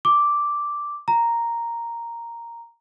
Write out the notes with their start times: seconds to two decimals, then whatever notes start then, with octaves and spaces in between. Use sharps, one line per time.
0.05 D6
1.08 A#5